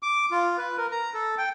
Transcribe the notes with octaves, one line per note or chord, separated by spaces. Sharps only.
D6
F4
B4
A#4
A#5
A4
G5